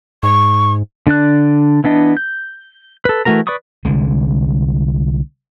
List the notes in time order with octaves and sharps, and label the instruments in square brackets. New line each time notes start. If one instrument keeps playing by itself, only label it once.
[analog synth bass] G#2 [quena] C#6
[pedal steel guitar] D3 D4 D5 F#6
E3 B3 D4 D#5
G6
A4 B4
E3 A3 F#4 A#4 A#5
B4 D5 B5 C#6 D#6
[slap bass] C2 D3 G#3